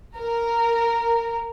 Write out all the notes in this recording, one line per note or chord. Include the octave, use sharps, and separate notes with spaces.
A#4